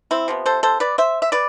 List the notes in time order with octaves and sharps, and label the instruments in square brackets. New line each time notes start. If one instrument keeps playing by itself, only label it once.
[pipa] C4 E4
C3 F3 B3
A4 C5
A4 C5
B4 D5
C5 E5
E5
B4 D5